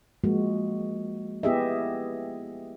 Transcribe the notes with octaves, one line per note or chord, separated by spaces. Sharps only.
F3 G#3 A#3 F#4
B3 E4 G4 G#4 D#5 E5